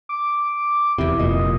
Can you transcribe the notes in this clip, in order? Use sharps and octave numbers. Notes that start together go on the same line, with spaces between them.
D6
E2 C3 E4
F1 A#2 D#5